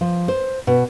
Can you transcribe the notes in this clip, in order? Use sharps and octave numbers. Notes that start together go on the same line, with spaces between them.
F3
C5
B2